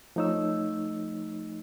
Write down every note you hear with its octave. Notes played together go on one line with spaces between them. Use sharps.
F3 A3 D#4 C#5 E6